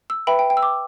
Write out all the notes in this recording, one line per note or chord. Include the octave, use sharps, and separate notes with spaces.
E6
B4 E5 G5 B5
G5
G5
E6
D6